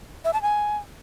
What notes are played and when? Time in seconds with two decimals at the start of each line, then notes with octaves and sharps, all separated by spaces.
0.25 E5
0.33 A5
0.42 G#5